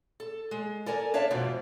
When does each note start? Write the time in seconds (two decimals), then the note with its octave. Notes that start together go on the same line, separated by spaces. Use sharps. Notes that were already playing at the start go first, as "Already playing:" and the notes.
0.20 A4
0.51 G#3
0.86 A4 A#4 D5 G#5
1.14 D4 C#5 E5 F5 A5
1.30 F2 G#2 B2 E3 F3